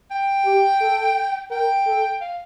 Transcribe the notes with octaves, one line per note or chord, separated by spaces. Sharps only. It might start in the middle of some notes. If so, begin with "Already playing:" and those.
G5
G4
A4
A#4 G5
A4
F5